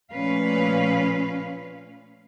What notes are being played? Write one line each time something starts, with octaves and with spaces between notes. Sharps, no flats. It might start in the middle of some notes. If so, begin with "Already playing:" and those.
A#2 F3 A3 C#4 B4 F5